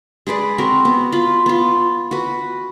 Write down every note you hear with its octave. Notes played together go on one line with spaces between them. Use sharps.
G#3 G#4 B4 D5
C4 F#4 A#4
B3
F4 B5
B3 F4
F#4 B4